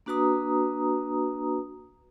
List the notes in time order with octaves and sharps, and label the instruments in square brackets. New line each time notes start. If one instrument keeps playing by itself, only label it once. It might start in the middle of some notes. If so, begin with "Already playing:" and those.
[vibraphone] A#3 D4 F#4 B4 A#5 D#6